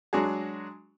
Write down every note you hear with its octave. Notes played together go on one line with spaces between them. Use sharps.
F#3 G#3 D4 F#4 G#4